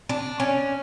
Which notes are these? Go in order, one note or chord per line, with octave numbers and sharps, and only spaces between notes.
D4
C#4